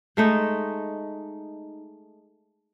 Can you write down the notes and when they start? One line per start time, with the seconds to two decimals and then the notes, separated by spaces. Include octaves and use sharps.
0.17 G#3 A3 D#4